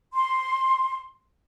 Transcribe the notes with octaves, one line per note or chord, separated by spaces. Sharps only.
C6